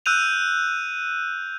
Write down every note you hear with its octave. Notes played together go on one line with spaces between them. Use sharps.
E6 F#6 G6 D#7 F7